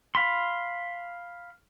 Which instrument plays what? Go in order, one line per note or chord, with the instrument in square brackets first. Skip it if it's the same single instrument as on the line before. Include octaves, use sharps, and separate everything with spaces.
[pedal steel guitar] F5 B5 C6